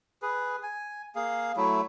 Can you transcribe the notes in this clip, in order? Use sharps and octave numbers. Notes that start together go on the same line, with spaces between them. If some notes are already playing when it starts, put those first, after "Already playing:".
G#4 B4
G#5
A#3 G#4 F5
F#3 A3 E4